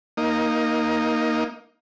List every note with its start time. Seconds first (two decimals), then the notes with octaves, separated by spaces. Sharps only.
0.17 A#3 D#4